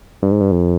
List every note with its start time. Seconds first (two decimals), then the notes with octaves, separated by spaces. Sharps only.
0.22 G2
0.31 G#2
0.41 G2
0.52 F2